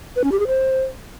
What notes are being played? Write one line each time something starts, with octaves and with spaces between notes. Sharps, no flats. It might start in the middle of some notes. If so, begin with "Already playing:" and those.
B4
C#4
G4
G#4
C5